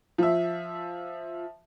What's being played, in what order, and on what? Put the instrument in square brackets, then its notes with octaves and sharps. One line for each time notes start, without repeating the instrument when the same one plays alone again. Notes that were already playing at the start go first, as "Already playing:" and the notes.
[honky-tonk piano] F3 E5